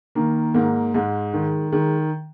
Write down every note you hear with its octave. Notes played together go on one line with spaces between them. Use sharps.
D#3 A#3
G#2 A#3
G#2 G#3
D#3
D#3 G#3